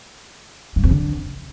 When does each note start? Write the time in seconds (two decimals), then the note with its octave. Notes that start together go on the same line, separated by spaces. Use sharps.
0.76 G2
0.84 F2
0.91 D3